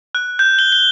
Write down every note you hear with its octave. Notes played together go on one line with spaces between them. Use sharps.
F#6
G6
G7
G7